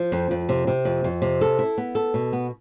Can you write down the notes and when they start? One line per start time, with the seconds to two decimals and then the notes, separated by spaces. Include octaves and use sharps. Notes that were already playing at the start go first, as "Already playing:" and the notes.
Already playing: F3
0.12 F2
0.31 F2
0.49 C3
0.67 C3
0.85 F2
1.04 F2
1.22 C3
1.41 A4
1.59 E4
1.78 B3
1.95 A4
2.14 B2
2.33 B3